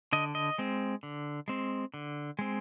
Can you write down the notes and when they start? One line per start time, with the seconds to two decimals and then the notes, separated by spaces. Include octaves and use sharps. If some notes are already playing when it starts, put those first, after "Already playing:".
0.13 D3 D#5
0.35 D#5
0.58 G#3 C4
1.03 D3
1.48 G#3 C4
1.94 D3
2.39 G#3 C4